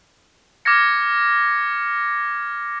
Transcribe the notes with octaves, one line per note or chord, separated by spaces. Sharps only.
D6 F6 G#6 A#6 C#7